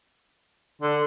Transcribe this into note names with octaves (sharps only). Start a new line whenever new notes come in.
D3